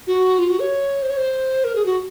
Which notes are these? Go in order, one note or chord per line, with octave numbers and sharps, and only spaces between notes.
F#4
F4
F#4
C#5
C5
C#5
C5
A#4
G#4
F#4